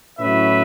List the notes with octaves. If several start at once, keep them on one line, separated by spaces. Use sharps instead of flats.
A2 F#3 C#4 E4 B4 E5